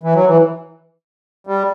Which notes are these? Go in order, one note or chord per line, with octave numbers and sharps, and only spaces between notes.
E3
F#3
E3
G3